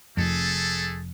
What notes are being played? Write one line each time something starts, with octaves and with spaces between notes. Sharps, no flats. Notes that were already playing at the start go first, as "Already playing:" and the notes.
F1 F2 A3 G#4 A4